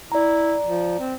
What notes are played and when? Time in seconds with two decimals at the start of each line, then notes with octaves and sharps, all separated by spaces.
0.12 E4 D5 A#5
0.66 F3
0.99 C4